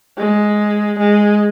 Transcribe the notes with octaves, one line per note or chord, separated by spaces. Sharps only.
G#3
G#3